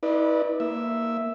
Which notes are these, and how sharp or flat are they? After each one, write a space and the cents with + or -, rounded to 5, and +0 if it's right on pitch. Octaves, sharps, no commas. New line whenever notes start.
E4 -40 B4 -20 D5 +25
A#3 +0 E5 +0